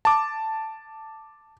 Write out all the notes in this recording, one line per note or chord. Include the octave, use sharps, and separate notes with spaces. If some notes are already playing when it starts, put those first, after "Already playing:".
A5 D6